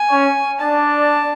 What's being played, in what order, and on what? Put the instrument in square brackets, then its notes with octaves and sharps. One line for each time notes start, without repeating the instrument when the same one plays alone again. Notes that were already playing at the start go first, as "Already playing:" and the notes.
Already playing: [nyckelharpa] G#5
[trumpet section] C#4 C#5
[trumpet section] D4 D5 [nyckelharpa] A5